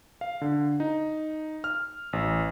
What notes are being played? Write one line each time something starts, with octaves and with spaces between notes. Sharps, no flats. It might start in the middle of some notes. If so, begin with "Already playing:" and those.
F5
D3
D#4
F6
A1